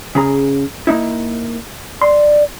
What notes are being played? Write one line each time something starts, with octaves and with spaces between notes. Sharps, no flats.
C#3 G#4 A#5
A#3 D#4 E4
D5 C6